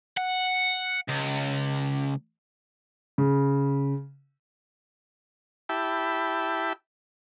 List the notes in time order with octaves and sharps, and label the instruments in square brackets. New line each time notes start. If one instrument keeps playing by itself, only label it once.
[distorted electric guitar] F#5
C#2
[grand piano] C#3
[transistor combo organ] E4 G4 E5 G5 A5 B5